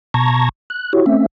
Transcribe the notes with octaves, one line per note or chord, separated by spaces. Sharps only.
B2 A5 A#5 C#6 G#6 A#6
F#6
E4 F#4 G4 C#5
A3 C4 C#4 E5